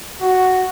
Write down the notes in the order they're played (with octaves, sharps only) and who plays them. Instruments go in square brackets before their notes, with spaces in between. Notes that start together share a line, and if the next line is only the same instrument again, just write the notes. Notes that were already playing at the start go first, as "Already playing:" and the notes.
[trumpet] F#4